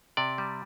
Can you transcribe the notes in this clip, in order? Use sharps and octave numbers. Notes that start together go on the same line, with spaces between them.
C3 D5
G3